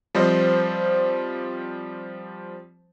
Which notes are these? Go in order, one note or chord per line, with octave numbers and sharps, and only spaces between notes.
F3 G3 C4 C5 D#5